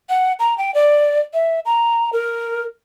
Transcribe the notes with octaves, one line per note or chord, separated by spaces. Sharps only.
F#5
A#5
G5
D5
E5
A#5
A#4